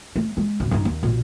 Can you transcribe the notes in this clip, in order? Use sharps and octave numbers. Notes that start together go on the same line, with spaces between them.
A3
G#3
G#1 D#2
G2 D#4
D#2
A#1 B2